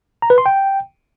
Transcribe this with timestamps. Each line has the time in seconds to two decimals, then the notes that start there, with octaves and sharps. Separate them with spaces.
0.22 A#5
0.30 B4
0.38 C6
0.46 G5